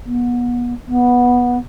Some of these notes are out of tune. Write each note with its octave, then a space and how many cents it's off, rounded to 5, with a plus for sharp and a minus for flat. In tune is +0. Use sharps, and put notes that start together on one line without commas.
B3 -30
B3 -10